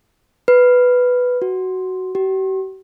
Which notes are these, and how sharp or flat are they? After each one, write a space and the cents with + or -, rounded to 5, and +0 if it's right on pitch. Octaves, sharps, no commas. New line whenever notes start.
B4 +5
F#4 +10
G4 -45